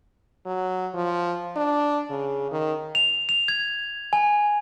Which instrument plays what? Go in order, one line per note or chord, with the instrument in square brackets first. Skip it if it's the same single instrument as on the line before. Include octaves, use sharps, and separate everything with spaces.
[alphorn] F#3
F3
D4
C#3
D#3
[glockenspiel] F7
F7
G#6
G#5